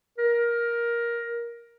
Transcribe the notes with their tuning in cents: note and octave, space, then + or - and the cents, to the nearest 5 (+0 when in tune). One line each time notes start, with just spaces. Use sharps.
A#4 +15